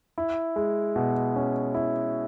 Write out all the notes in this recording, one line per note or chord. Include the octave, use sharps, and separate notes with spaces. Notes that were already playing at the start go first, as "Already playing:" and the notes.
E4
G#3
B2
C#4
E4